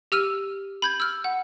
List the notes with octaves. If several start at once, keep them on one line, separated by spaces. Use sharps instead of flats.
G4 E6 F6 D#7
B5 G6 G#6
E6 F6
F#5